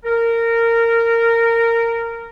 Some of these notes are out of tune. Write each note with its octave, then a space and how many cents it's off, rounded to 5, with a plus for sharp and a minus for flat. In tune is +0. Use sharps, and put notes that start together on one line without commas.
A#4 -15